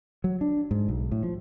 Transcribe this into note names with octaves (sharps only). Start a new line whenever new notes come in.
F#3
D4
G#2
B1
A2
F3